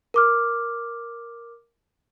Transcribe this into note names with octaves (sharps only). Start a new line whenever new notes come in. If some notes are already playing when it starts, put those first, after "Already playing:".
A#4 D6 F6